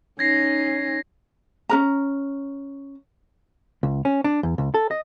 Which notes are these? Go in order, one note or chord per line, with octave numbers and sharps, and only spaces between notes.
C#4 D#4 G#6 A#6 C7
C#4 A#4 A#5
C#2
C#4
D4
E2
C#2
A4
D#5